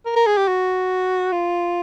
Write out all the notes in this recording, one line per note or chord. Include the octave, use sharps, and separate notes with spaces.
A#4
A#4
G#4
G4
F#4
F4